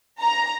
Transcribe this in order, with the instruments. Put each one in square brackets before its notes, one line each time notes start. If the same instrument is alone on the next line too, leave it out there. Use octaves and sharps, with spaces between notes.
[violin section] A#5